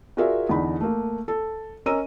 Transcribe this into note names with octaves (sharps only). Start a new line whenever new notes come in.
F4 F#4 G#4 A#4 D5 E5
E2 D3 D#4 B5
A3 A#3
A4
C#4 A#4 D#5 A#5 E6 D#7